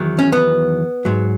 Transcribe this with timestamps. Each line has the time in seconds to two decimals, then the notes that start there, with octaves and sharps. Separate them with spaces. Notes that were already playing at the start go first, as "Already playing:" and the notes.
Already playing: E2 D#3 F#3
0.19 C#4
0.32 B3
1.05 G#2 F#3